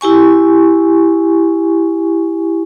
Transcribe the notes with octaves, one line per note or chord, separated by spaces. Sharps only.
E4 G4 G#5 C#6